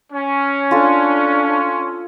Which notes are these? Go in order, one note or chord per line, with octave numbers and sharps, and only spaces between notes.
C#4
D4 F4 A4